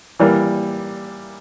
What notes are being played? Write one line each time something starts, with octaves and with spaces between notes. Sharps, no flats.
E3 G3 A#3